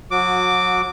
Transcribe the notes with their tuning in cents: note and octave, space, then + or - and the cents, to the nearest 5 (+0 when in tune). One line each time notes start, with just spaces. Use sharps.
F#3 -30 F#4 -20 D6 +0